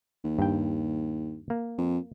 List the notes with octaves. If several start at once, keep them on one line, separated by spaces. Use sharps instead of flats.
D#2
G2 G5
A#3
F2